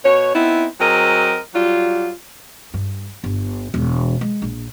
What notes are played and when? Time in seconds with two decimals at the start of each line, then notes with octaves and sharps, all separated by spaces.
0.05 B2 C#5
0.35 B3 C4 D#4 E4
0.80 F#3 C4 G#4 A#4 D#5
1.55 F#3 G3 F4
2.74 G2
3.23 G1
3.74 E1
4.21 G#3
4.42 A#1